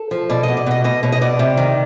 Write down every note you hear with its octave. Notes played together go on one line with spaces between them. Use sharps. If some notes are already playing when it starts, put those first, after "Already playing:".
Already playing: A4
F3
B2 D5
B2 D#5
D5
B2 D#5
B2 D#5
B2 C#5
D#5
B2 D5
C3
D#3